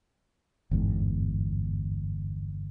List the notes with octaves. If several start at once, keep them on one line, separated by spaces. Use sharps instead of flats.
G1 E2 G#2